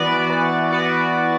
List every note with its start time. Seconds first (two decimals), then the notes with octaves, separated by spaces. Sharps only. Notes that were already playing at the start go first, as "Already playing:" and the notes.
Already playing: E3 B3 F#4 B4 D5
0.30 E3
0.72 B3 F#4 B4 D5